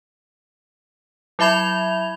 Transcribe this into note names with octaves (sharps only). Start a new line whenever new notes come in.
F#3 E4 E5 B5 G#6 F7